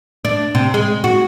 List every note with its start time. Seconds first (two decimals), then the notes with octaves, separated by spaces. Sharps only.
0.25 D4
0.55 C3
0.74 G#3
1.04 F#4